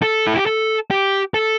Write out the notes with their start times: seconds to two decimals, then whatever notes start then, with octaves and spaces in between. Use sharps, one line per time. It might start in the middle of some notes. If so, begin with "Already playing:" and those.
0.02 A4
0.27 E4
0.37 G4
0.46 A4
0.91 G4
1.34 A4